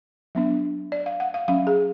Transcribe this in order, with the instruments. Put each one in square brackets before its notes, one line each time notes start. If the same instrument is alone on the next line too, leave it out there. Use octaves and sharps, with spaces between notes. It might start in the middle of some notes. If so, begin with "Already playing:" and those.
[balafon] F#3 B3 D4
D5
F5
F#5
F5
F#3 C#4 F5
G#4